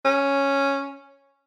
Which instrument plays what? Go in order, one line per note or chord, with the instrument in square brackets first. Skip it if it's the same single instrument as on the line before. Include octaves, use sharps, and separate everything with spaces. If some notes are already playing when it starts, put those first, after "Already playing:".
[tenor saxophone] C#4